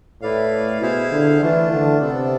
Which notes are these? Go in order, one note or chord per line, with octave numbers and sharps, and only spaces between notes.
A2 E4 B4 D5 F5
B2 E4 G#4 C5 F5
D3
E3 A3 D4 F4
D3
C3 B3 D4 A4 D5